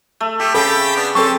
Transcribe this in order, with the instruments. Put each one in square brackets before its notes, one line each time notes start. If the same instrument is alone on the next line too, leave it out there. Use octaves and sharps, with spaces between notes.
[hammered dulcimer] A3
[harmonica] A3 [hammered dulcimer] G4
[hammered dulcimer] C#3 [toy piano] A4 [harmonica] G5 A5 B5
[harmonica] B3 D4
[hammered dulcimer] C4 [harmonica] C#4 G4 A5 [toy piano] A4 C#6